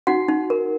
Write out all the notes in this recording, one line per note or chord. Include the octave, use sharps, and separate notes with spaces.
D#4 F#4 F#5
D#4
A#4